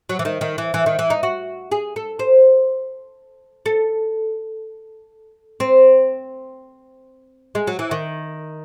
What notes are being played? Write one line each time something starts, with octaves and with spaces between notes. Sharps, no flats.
F#3
E3
D#3
D#3
E3
E3
D#3
E3
D#4
F#4
G#4
A4
C5
A4
C4
G#3
F#3
E3
D#3